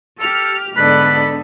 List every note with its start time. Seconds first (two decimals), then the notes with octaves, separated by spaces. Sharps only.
0.20 G4 A4 F6
0.77 G#2 D3 B3 A4 B4 D5 B5